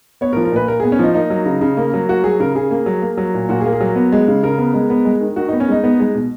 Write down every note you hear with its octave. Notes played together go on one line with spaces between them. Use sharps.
B3 C#5
A#4
F3
A#4
A#2 B4
A#2 A#4
G#4
B3
C#4
F3 D#4
A#3 D#4
F#3
C#3
C#3
A#3
F#3
A#3 F#4
F#3 G#4
C#3 A#4
C#3 G#4
A#3
F#3
A#3
F#3
A#2
A#2 F#4
G#4
A#3
G#4
F#3
B3
G#3
C#3
C#3 A#4
B3
G#3
B3
G#3
D#3
D#3 F#4
D#4
B3
C#4
G#3 D#4
B3
G#3
B2